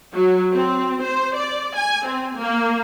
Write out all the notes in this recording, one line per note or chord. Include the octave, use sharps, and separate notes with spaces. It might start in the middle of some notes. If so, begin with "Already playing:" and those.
F#3
C4
C5
D5
G#5
C4
A#3